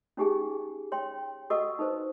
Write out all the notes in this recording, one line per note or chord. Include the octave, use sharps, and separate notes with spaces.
C#4 D#4 G4 G#4 G#5
C#5 G5 C6
F#4 A4 D#5 F#5 C#6 E6
D#4 A4 B4 C5